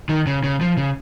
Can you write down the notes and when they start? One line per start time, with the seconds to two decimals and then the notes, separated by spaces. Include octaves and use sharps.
0.09 D#3
0.27 C#3
0.44 C#3
0.61 F3
0.77 C#3